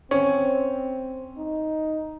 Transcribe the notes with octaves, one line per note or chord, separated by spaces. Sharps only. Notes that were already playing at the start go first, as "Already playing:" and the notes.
C4 C#4
D#4